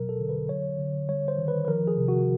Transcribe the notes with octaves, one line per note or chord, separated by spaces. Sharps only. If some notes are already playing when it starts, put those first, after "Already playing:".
Already playing: B2 F#3 A#4
A4
D3
B4
F#3 C#5
D3
G3 C#5
C5
D#3
B4
B4
F3 A#4
G#4
C3
F#4